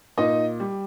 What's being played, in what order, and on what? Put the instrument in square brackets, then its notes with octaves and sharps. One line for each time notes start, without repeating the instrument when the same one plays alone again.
[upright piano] A#2 D#4 D#5
G3